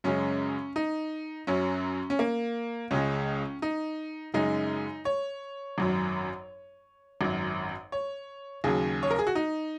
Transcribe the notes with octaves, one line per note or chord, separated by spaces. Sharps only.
F#2 C#3 G#3 C#4
D#4
F#2 F#3 C#4
C#4
A#3
C#2 C#3 G#3 C#4
D#4
F#2 C#3 G#3 D#4
C#5
G#1 F#2 F#3
G#1 F#2 F#3
C#5
D#2 C#3 F#3 G#4
C#5
A#4
G#4
F#4
D#4